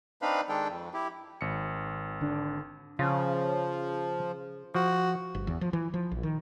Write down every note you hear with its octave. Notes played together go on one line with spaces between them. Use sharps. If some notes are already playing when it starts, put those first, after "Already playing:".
C4 D4 D#4 B4 F5 B5
D#3 G#3 D4 A4 G5
F2
E4 G4
G#1 C#7
D3 D4
C#3 F3 F4
F3 F#4
G1
E2
F3
E3
F3
A#1
D#3